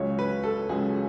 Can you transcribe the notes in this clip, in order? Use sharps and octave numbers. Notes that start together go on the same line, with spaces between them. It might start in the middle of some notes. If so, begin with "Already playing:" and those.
Already playing: C#2 C#3 F#3 C#5
B4
A4
C#2 C#3 F#3 G#4